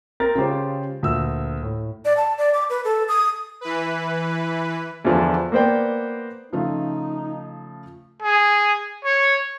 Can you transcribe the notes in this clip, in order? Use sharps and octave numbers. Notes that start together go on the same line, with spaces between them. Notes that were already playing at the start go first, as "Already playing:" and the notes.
C4 A#4 A6
C#3 G#3 F4 G4 C5
D2 A#2 E5 E6
A2
D5
A5
D5
D6
B4
A4
D#6
E3 B4
E2 D3 F3 B3
A#3 B3 C5 D5 G5
C#3 F3 A3 D#4
G#4
C#5